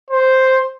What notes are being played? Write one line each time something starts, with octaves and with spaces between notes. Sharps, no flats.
C5